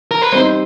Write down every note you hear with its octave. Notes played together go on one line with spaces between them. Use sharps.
A#4
B4
G3 C4 D#4 C5